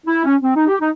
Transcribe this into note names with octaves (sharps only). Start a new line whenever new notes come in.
E4
C#4
C4
D#4
G4
D#4